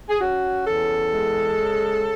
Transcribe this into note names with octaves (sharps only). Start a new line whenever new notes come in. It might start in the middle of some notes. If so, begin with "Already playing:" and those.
G#4
C#4 F#4
E2 A4
G#3
C#3